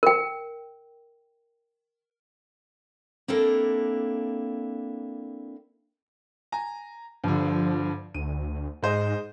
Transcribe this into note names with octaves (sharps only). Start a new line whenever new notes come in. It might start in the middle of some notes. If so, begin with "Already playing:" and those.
A#4 G5
A#3 C4 D4 E4 A4 A#4
G#5 A#5
G2 D3 F3
D2 D#7
G#2 G#3 C5 D#5